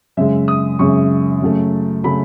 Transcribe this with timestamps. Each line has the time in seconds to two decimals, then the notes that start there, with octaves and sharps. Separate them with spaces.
0.17 F#2 C#3 G#3 E5
0.48 D#6
0.79 F#2 C#3 G#3 C#6
1.42 F#2 C#3 F#3 A3
2.04 C#3 F#3 A3 B5